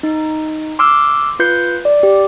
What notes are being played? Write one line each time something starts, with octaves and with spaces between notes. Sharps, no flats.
D#4
C6 D6 E6 F6
F4 B4 G6 C7 C#7
D5
G4